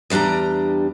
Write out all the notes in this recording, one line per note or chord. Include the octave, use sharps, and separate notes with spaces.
E2 G3 D4 G4 A#5